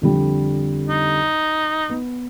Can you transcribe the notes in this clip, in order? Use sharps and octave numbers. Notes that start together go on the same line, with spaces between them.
F2 D3 G3
D#4
B3